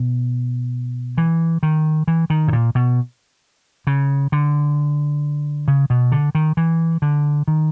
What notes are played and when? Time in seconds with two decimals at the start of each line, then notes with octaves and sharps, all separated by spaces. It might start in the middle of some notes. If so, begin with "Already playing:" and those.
Already playing: B2
1.18 E3
1.63 D#3
2.07 E3
2.30 D#3
2.48 A2
2.53 A#2
2.75 B2
3.87 C#3
4.32 D3
5.68 C#3
5.90 B2
6.12 D3
6.35 D#3
6.57 E3
7.02 D3
7.48 D#3